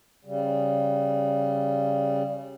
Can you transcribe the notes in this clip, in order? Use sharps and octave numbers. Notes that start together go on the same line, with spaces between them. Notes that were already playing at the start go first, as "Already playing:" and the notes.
C#3 G3